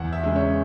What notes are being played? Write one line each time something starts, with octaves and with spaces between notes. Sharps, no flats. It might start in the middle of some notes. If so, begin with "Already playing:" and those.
Already playing: E2 F#5
E5
C#3 G#3
C#5